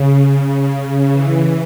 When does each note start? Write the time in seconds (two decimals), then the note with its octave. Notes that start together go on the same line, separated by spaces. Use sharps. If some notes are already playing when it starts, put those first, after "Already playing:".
Already playing: C#3
1.12 E3